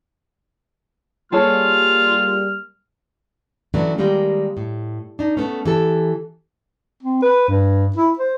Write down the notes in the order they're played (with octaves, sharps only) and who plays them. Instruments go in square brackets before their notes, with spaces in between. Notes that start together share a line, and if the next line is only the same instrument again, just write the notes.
[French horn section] G3 A#3 [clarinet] F4 [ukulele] G#4 A4 C#5 [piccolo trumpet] F6
[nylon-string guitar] E3 F#3 A3 C#4 D4
D#3 G3 G#3 A#3 G4
A2
D4 D#4
A3 B3 C#4
E3 G4 A4
[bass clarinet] C4
B4
G2
E4
C5